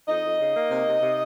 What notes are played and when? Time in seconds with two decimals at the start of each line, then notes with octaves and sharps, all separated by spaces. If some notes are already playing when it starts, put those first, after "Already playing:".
0.08 F2 D#4 D#5
0.24 F2
0.40 C#3
0.55 A#3
0.71 C3
0.86 C3
1.02 C3